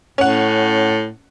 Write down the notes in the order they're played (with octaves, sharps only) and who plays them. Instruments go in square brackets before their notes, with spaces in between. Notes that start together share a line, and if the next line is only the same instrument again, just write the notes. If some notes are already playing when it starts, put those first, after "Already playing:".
[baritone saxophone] A2 [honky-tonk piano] C#4 F#5